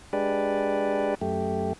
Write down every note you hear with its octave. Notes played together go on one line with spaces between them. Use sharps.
G#3 D4 G4 B4 D5
F#2 A3 G4